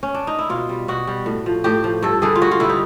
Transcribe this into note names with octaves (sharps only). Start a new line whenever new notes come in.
C#4
D4
D#4
E4
B2 F4
G3
B2 F#4
G3
A2
F3
A2 G4
F3
G2 A4
D3 G3 G#4
F4
G2 F#4
F4
D3 G3 E4
D#4